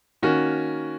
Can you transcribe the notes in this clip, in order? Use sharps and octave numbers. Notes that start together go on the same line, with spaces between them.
D#3 A#3 C#4 F#4